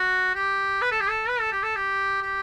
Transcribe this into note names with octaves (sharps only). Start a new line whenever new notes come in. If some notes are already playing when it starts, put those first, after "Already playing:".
Already playing: F#4
G4
B4
A4
G4
A4
B4
A4
G4
A4
G4
G4